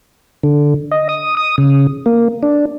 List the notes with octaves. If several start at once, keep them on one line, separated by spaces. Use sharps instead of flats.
D3
D#5
D#6
D#6
C#3
A#3
D4